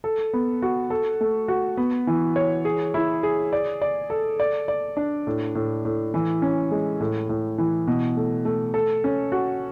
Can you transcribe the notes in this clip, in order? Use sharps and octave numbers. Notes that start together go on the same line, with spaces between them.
A4
B3
F#4
A4
A3
F#4
B3
E3
C#5
G#4
E4
G#4
D5
D5
A4
D5
D5
D4
A2
A2
A2
E3
C#4
G#3
A2
A2
E3
B2
A3
A3
A4
C#4
F#4